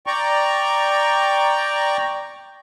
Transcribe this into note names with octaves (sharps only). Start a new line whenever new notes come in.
D5 G5 A#5 C#6